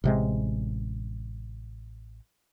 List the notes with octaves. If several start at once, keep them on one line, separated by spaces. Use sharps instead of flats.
A1 C3 G#3